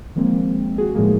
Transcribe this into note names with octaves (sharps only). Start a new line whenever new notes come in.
D#3 F3 G#3 A#3 C4
F#4 G#4
A2 D#3 F3 G#3 A#3